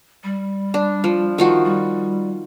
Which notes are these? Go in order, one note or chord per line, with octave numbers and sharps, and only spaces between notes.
G3
D4
F3
D#3 F3 F#4
G3